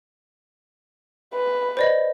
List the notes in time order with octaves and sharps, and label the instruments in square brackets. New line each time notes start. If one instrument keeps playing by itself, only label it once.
[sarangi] B4
[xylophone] C5 D5 D#5